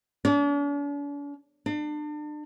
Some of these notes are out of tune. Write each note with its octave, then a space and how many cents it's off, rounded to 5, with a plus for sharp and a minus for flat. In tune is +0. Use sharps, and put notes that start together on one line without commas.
D4 -45
D4 +35